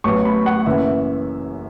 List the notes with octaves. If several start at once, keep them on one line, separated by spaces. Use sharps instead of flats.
A1 A2 F#3 B3 C#6
B5
F#5
F#1 F#2 E3 E5